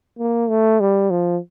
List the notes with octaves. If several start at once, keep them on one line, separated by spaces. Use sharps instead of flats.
A#3
A3
G3
F3